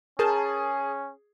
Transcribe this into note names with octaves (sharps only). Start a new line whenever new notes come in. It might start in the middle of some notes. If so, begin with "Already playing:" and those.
C#4 G#4 A#4 A5 G6